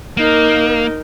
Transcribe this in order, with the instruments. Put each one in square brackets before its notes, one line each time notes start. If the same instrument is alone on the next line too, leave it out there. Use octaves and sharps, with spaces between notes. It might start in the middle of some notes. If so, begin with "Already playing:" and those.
[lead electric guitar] A#3 [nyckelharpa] D#4 A#4